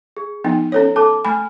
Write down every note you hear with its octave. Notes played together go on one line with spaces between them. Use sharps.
G#4
F3 B3 D#4 G5
C#4 A4 C#5
A4 A5 D6
A3 G#5 B5 F6